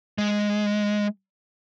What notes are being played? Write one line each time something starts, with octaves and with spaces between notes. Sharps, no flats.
G#3